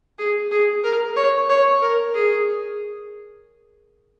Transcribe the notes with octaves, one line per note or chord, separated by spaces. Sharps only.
G#4
G#4
A#4
C#5
C#5
A#4
G#4